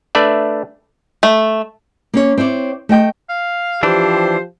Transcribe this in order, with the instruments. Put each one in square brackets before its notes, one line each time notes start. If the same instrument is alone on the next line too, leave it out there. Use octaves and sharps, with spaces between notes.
[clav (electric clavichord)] A3 D4 B4 D5 E5
[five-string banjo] A3
[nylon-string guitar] A#3 C#4 C#5
C4 E4 C#5 D5
A3 D#5 G5
[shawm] F5
[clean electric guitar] E3 D4 [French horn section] F3 G4 [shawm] C5